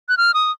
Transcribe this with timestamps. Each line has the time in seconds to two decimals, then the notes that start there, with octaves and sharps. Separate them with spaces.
0.09 F#6
0.17 F6
0.34 D#6